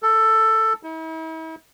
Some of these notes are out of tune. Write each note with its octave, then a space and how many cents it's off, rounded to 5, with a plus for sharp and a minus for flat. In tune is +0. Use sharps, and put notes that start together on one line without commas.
A4 +10
E4 -45